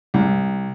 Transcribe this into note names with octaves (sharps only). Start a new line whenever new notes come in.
C2